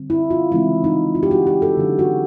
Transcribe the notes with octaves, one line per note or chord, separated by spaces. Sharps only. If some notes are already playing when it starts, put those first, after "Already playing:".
Already playing: D3 G3 C4
E4
F4
C#3 E3 G#3 C4 D#4 E4
D#4
F4
G4
F#4
G4
A4
D3 F#3 B3 D4
F#4